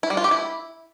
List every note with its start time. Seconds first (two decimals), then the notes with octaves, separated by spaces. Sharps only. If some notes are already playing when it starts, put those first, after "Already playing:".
0.03 E4
0.10 G3
0.17 F4
0.24 G4
0.31 E4